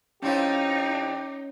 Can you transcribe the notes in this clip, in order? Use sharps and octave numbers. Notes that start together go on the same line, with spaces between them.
F3 C4 C#4 D#4 E4 G4 C#5